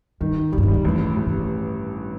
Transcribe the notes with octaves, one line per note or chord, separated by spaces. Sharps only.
G2 D#3
D#3
C#3 G3
G2
G#2
G3
F2
A1 E2
G2
A1
C3